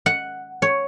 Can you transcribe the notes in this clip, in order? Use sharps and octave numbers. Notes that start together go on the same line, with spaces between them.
F#5
C#5